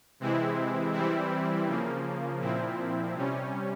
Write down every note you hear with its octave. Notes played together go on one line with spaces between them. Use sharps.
C3 E3 G#3 C4 E4
E3 G3 C4 E4
C#3 F3 A#3
A#2 F3 C4 E4
C3 G3 C#4